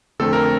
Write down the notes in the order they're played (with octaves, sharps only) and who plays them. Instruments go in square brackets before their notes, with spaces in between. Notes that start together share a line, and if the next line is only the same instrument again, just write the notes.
[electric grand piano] F2 D3 A3 C4 A4
A#4